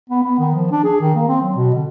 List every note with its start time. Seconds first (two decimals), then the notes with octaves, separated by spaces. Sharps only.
0.10 B3
0.23 B3
0.39 D#3
0.56 F3
0.71 D4
0.84 G#4
1.01 D#3
1.15 A#3
1.28 C4
1.42 F#3
1.56 B2
1.75 D3